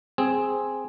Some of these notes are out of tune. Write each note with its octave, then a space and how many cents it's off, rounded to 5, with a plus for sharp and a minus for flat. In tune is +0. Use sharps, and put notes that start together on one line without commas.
C4 +0 G#4 +0